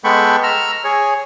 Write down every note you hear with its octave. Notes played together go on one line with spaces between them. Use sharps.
G#3 B3 A4 G5 B5 C#6
A#5 E6 F6
G#4 C#5